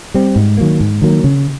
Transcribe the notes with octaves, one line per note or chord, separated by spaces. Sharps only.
G3 C4
G#2
D#3 F#3 A#3
G#2
D#3 F#3 A#3
C#3